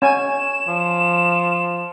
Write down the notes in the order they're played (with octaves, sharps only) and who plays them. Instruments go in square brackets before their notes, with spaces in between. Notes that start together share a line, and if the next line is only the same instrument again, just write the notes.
[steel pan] C#4 G#5 [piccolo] E7
[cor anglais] F3